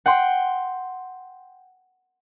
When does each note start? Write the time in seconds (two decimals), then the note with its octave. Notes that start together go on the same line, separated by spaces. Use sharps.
0.06 F#5 G5 C6